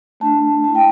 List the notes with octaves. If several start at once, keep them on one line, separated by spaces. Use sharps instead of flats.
A3 D4 A5
A3 E4 A5
G5